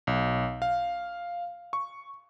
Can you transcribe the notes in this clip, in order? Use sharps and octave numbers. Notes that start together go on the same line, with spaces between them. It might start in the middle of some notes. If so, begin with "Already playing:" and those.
B1
F5
C#6